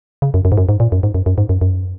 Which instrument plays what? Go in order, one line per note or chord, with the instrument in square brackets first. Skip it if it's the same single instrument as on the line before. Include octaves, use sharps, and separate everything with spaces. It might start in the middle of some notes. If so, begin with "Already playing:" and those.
[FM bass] C#3
F#2
F#2
G#2
F#2
G#2
A#2
F#2
G#2
F#2
F#2
G#2
F#2
F#2